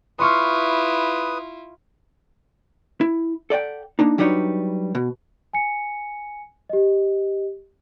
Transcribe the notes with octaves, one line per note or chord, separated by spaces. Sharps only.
E4 F4 B4 C6 C#6 D#6 F6
E4
A4 D5 F#5 G5
A#3 D4 D#4
F#3 G3 D4 D#4 B4 C#5
B2
G#5 C#7
G4 D#5